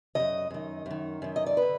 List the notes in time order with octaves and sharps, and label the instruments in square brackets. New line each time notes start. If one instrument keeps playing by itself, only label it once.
[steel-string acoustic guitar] D#3 D#5
F#2
F#2 D#3
F#2 D#3
F#2 D#3
D#5
D5
D3 B4